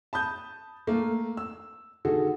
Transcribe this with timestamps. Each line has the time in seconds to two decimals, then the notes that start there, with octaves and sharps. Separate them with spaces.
0.13 A5 B5 D#6 G6
0.87 A3 A#3
1.37 E6
2.05 D3 D#3 F#4 G#4 A4